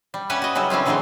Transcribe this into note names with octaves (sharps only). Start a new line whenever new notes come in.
G3
C#4 G4 B4 E5 F#5 G#5
F#4 D#5
C#3 F#3 G3 E4
D3 C4 C#4 E4 F4
D3 E3 F#3 G#3 C4 D#4